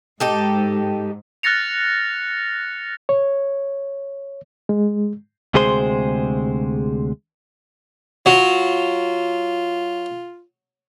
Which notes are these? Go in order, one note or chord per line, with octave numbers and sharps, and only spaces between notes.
G#2 D#4 G4 A4
F6 F#6 A6 A#6 C#7 F7
C#5
G#3
D2 C3 G#3 G#4 C5 C6
F#3 F4